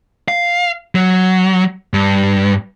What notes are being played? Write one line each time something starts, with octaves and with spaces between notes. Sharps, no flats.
F5
F#3
G2